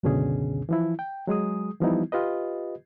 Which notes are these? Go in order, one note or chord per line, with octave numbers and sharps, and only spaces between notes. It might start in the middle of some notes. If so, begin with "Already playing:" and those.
C#2 F#2 B2 D3 C#4 G#4
E3 F3 E4
G5
F#3 G#3 G#4 D#6
E3 F3 G3 B3 D#4 E4
F4 G4 B4 D#5